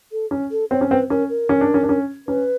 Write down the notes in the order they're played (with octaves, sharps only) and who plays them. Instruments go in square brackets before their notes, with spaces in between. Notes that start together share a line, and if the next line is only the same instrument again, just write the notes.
[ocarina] A4
[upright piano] C#4
[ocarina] A4
[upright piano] C4 [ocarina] C#5
[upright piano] C#4
[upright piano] C4 [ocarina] B4
[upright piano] C#4 [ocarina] A#4
[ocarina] A#4
[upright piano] C#4
D4
C#4
D4
C#4
[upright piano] C#4 [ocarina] B4